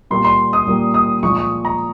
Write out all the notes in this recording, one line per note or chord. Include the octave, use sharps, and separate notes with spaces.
A#2 G3 A#3 C6
C6
D#6
A#2 G3 A#3
D#6
A#2 F3 G#3 C#6
C#6
A#5